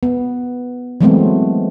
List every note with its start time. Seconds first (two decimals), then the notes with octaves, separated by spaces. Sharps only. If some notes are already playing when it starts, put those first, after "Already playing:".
0.03 B3
1.01 E3 F#3 G#3 A3 B3 C4